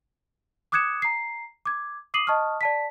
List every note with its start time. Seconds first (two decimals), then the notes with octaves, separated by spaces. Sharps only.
0.72 D6 D#6 F#6 G#6 C#7 E7
1.02 A#5 C7
1.65 D6 G#6
2.14 D6 D#6 C7 D#7 F#7
2.27 D#5 A5 C#6 D#6 F6
2.61 D5 A5 B6